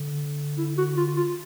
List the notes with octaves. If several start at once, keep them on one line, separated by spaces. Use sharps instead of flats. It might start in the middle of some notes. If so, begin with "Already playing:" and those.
Already playing: D3
E4
F#4
F4
F4